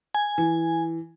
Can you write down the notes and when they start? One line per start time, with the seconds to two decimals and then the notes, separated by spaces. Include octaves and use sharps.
0.15 G#5
0.38 E3